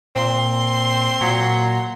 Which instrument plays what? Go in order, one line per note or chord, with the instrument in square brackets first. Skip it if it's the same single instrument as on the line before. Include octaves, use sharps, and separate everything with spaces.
[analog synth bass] A#2 [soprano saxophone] C4 [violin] C6
[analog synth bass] A#2 [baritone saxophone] F#3